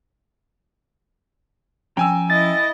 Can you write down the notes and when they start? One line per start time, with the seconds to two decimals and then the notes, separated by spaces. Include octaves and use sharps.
1.97 F3 C#4 G5 G#5 A#5 E6
2.30 E4 D#5 A6